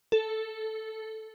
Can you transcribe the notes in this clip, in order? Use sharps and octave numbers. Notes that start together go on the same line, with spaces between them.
A4